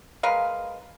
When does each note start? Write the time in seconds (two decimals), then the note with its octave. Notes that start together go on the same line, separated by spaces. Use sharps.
0.23 G#3 A#4 B4 F5